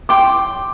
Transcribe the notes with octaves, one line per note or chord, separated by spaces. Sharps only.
G5 C6 D6